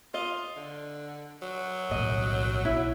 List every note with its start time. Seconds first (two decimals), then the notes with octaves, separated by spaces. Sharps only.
0.14 F4 D#5
0.56 D3
1.42 F#3
1.91 B1 A2 D#5
2.65 B1 E4